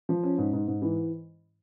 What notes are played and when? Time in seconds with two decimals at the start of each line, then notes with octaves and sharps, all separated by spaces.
0.09 F3
0.23 C#4
0.38 G#2
0.53 G#2
0.68 G#2
0.82 E3